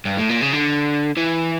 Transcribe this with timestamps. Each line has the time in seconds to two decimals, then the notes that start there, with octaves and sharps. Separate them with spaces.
0.05 G2
0.17 A2
0.29 A#2
0.41 C#3
0.53 D3
1.17 E3